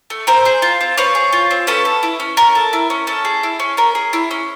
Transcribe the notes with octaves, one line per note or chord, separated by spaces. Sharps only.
A3
C4 A#4 C5
G#4
F4
C4
C4 B4 C#5
G#4
F4
C4
C#4 A4 B4
A4
E4
C#4
C#4 A#4
A4
E4
C#4
C#4 A4
G#4
E4
C#4
C#4 A#4
G#4
E4
C#4